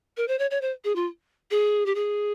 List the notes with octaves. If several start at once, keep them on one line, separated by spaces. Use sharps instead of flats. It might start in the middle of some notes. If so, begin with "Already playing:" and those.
A#4
C5
C#5
C#5
C5
G#4
F4
G#4
G4
G#4